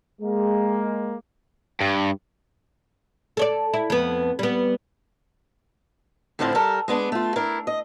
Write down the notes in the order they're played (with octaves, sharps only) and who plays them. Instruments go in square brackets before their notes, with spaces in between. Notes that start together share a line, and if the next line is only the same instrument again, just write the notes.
[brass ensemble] G#3 A#3
[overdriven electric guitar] G2
[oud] A4 C#5 D5
E4
F2 B3
G3 B3
[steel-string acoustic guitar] F2 A2 D3 F3 C4 E4
G3 A4 A#4
G#3 B3 D4
A3 F4
D4 E4 A#4
D#5